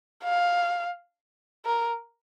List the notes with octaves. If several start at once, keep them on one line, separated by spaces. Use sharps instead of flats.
F5
A#4